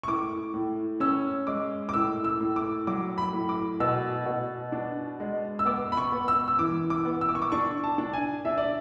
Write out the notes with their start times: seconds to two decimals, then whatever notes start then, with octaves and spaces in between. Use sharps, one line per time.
0.03 C#6
0.07 A2 D6
0.54 A2
1.00 C#4 E6
1.47 G#3 D6
1.89 D6
1.93 A2 E6
2.24 E6
2.41 A2
2.56 D6
2.87 F#3 D6
3.18 B5
3.33 A2
3.49 D6
3.80 B2 E6
4.26 B2
4.72 D4
5.20 G#3
5.59 E6
5.66 B3 D6
5.92 B5
5.97 C#6
6.12 B3
6.28 E6
6.48 E6
6.59 E3 D6
6.90 D6
7.05 B3
7.21 E6
7.29 D6
7.35 C#6
7.42 D6
7.52 D4 C#6
7.84 A5
7.98 D4
8.13 G#5
8.45 D4 E5
8.58 D5